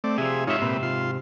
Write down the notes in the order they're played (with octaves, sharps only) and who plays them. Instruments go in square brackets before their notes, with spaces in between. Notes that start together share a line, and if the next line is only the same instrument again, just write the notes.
[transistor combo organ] A3 C4 D5
[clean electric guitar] C3 F3 [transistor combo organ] G#4 E5
[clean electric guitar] G#2 C3 E5 [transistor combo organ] D#4 F4 C#5
[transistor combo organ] A#2 C4 B4
F4 C6